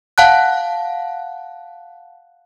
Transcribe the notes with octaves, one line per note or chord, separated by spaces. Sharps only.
F5 F#5 A5 F#6